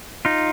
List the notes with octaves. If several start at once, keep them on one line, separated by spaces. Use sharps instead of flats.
D#4 F4